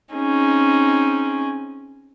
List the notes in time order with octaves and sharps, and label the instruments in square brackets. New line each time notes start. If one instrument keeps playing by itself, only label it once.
[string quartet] C4 C#4 D#4 G#4